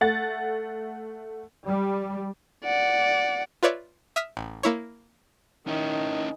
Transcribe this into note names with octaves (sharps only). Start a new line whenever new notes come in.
A3 F#5 A6
G3
D5 F#5
F4 B4 C#5 D5 E5
E5 D#6 F6 B6
A1
A#3 E4 C#5
D#3 C#4 E4